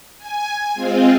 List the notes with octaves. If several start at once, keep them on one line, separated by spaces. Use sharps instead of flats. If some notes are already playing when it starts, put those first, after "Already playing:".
G#5
G#3 C4 F4